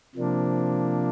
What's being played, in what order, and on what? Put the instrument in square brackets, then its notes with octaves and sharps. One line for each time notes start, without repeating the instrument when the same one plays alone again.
[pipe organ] C3 F3 A#3 D4